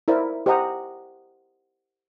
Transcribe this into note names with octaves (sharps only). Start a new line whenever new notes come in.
E4 A#4 C5 D5 E5
G4 C5 D#5 F#5 A#5 D#6